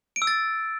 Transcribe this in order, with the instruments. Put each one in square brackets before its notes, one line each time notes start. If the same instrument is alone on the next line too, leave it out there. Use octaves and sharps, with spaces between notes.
[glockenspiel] D7
E6
A6